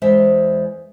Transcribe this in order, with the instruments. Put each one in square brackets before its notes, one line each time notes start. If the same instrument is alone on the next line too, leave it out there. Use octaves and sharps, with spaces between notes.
[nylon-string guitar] E2 G#3 C5 E5